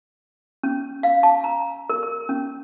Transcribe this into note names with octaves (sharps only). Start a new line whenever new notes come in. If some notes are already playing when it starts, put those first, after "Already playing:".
C#4
F5
A5
A#5
A#4
A#4
C#4